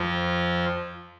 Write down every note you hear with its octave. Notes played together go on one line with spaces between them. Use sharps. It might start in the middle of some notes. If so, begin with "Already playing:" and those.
Already playing: F2 F3